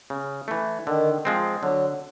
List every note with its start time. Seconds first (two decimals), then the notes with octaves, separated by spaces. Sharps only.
0.10 C#3
0.48 E3 A3
0.86 D3 D#3
1.25 F3 G#3 C4
1.63 D3 F#3